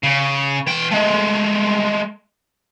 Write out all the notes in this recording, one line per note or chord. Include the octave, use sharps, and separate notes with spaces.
C#3
E3 G5
G#3 A3